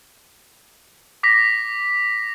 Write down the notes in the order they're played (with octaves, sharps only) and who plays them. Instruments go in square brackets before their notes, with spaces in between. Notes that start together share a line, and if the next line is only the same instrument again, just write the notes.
[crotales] D6 A#6 B6